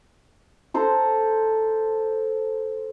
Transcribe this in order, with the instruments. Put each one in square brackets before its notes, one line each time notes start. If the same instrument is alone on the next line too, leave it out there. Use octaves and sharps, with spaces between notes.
[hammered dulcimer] A4 C5 A#5